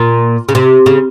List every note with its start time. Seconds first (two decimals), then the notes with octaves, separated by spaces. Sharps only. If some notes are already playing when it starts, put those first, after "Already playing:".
Already playing: A#2
0.49 C#3
0.55 C3
0.86 C#3